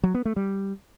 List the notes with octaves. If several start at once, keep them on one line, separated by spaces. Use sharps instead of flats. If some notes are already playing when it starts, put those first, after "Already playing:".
F#3
B3
A3
G3